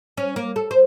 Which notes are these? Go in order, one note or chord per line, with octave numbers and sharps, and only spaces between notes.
C#4
A#3
A4
C5